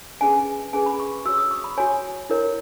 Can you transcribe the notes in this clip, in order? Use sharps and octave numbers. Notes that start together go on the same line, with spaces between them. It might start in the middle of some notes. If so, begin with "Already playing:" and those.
C#4 G#4 B4 G#5
C#4 G#4 B4 G#5
B5
C#6
F#4 C#5 E6
D#6
C#6
B5
F#4 C#5 G#5
E4 A#4 C#5